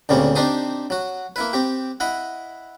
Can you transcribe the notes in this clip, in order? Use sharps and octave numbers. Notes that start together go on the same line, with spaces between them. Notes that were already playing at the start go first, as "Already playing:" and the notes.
D2 A#2 C#3 G3 A#3 C4
C4 D4 D#4 G4 C6 D#6
F#3 F#4
A#3 E4 B4
C4 G4
E4 D#5 F#5